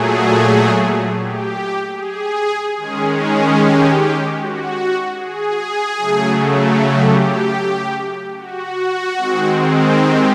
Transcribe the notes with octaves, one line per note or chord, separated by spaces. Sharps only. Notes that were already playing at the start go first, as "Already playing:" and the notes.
Already playing: A#2 F#3 A3 G#4
G4
G#4
D#3 G#3 C#4 G#4
G#4
G4
F#4
G#4
C#3 F#3 A3
G4
F#4
D#3 G#3 C4
G4